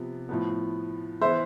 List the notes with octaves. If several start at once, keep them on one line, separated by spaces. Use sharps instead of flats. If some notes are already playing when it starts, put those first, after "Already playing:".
Already playing: C3 F3 B3
A2 F3 B3
E3 B3 C5 E5